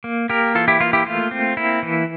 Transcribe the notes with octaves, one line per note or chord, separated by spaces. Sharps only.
A#3
A#3 G4 A#4
E3 F4 A4
E4 G4
A#3 F4
E4 G4
A3 F4
C4
A#3 E4
E3